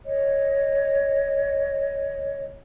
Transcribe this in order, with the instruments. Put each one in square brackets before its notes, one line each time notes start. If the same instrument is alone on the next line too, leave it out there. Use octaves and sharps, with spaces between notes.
[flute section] C#5 D#5